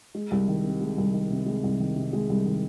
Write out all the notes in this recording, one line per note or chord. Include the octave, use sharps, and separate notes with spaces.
G#3
C2
D#3
C3
G#3
C2
D#3
C3
G#3
C2
D#3
C3
G#3
C2
D#3